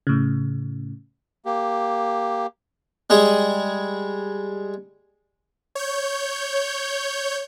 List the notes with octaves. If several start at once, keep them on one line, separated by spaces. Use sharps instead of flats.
A2 C#3
A#3 G4
G3 G#3 G#4
C#5 G6